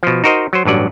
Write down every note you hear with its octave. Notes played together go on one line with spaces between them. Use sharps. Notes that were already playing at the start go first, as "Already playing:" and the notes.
B2 F3
D#4 F#4 A#4 C5 D#5
F#3 C5
A1 G2 F#3 D5